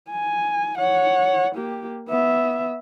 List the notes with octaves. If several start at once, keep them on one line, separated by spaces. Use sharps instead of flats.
G#5
C#5 F#5
A#3 G4
B3 E5